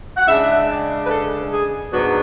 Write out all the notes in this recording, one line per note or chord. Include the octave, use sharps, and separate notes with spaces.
F#5
C#3 G#3 D4 E5
D5
B4
A4
G#4
G#2 F#3 B3 D4 F#4